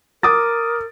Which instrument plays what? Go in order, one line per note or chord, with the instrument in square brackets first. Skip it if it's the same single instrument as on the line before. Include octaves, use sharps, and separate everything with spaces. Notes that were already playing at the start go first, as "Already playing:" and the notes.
[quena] A#4 [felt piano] D6 D#6 A6